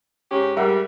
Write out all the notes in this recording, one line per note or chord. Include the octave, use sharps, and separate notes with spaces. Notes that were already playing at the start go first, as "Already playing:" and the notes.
G#2 C#4 G4
G#2 G3 A#4 E5 F#5